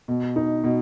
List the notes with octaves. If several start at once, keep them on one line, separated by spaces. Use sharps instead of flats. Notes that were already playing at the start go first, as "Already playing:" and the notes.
B2
D#4
B2